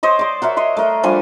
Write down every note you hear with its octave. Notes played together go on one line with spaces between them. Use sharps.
C5 C#5 D#5 D6
D5 C6
F#4 A#4 C#5 E5
C#5 D#5 C6
A3 A#4 D#5
F3 G3 D4 G#5